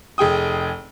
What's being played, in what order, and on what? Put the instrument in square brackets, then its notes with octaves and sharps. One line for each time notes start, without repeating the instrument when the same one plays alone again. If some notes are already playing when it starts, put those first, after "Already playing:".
[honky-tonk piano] F1 G#4 G5 D#6